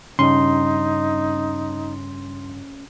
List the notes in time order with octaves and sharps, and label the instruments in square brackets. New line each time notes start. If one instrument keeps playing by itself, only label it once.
[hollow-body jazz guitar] G2 C#3 [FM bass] C#4 [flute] D#4 [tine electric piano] C6